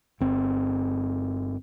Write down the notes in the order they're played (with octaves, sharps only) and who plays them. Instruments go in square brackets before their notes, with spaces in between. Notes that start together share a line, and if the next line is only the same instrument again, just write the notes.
[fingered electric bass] G1 C4